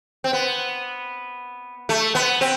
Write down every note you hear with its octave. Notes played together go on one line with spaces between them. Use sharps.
C4
B3
A3
B3
C4